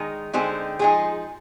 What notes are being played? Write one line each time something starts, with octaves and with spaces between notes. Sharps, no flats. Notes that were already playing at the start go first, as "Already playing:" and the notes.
Already playing: D#3 G#3 D#4
D3 G#3 C4 D#4 G4
F3 G#3 D#4 G#4